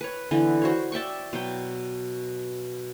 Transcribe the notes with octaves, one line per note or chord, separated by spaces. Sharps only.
B4 C#5
D3 E3 B3 B4
F#4 C5 C#5
D5 E5 G5 C#6
B2 F#3 G5